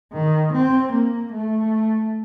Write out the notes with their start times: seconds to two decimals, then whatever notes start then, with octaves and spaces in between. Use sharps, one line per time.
0.13 D#3
0.53 C4
0.92 A#3
1.33 A3